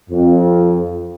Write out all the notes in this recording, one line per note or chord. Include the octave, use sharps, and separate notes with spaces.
F2